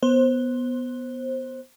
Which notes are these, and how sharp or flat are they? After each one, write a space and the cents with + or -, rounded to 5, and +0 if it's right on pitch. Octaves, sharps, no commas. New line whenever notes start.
B3 +0 C5 +15